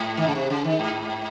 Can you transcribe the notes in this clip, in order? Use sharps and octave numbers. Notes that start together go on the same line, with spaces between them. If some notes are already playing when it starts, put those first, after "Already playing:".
Already playing: G#2
D#3
C#3
C3
C#3
D#3
G#2